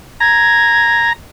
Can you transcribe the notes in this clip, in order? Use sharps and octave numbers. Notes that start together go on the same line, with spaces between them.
A#5 G#6